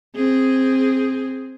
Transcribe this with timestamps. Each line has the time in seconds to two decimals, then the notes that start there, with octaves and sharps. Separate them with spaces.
0.16 C4 G#4